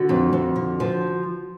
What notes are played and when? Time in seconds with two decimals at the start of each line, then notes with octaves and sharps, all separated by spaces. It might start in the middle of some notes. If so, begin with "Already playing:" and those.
Already playing: D3 F#4
0.09 F2
0.33 F2
0.56 D3
0.80 F3